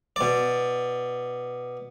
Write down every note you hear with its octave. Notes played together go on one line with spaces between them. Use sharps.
B2 D5